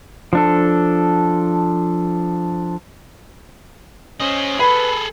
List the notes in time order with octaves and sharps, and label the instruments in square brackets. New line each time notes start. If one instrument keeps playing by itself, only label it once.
[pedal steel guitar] F3 D4 A4
[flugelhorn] C#4 [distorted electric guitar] C5 D#5
[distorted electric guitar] G#4 A4 [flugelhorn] B4 [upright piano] B5